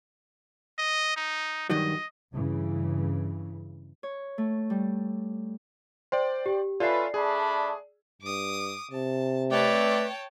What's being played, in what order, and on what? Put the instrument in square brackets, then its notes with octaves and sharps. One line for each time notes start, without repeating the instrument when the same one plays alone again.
[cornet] D#5
D#4
[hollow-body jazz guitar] G2 D#3 F#3 [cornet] D#5
[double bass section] G2 C#3 E3
[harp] C#5
A3
G3
[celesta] C5 [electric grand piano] D5 G5 C6
[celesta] G4
[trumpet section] C#4 B4 [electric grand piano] F4 A4 E5 [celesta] D5 C7
[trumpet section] A3 D4 B5 [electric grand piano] G#4
[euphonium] G2 [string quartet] D6 D#6
[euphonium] C3 [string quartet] A5
[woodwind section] A3 C4 B4 [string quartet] C#5 G5 A5 [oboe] D5